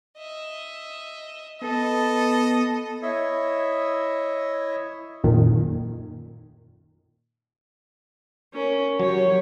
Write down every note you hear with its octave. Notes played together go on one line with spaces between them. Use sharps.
D#5 E5
B3 A4 B4 D#5
E4 C#5 D#5 E5
F#2 A#2 D#3
C#4 A#4
F#3 G4 C#5